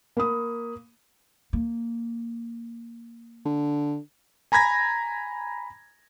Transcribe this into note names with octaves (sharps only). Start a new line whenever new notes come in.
A#3 B5 D#6
A#3
D3
G#5 A#5 B5 G#6 A#6